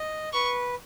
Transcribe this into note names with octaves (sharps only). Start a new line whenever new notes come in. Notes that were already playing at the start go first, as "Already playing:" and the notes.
Already playing: D#5
B4 C#6